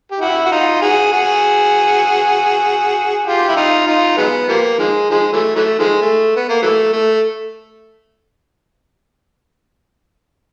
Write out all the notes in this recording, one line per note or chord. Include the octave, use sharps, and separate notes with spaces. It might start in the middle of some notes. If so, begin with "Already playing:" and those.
G4
E4 F#4
F#4
D#4 F4
F#4 G#4
F#4 G#4
F4 G4
E4
D#4 F4
D#4 F4
F#3 G#3 B3
F3 G3 A#3
D#3 F3 G#3
D#3 F3 G#3
E3 F#3 A3
E3 F#3 A3
D#3 F3 G#3
A3
B3
A#3
E3 F#3 A3
A3